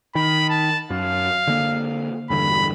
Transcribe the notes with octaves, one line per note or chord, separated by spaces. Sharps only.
D#3 B5
A5
F#2 F5
D3 A#3
E1 G2 D3 B5